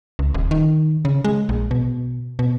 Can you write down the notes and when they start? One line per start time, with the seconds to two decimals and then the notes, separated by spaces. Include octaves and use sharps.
0.19 C#2
0.34 D#1
0.51 D#3
1.05 C#3
1.24 G#3
1.49 A#1
1.71 B2
2.39 B2